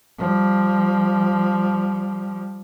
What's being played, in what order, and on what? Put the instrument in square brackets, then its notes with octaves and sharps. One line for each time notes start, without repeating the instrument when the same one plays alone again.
[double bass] F3 G3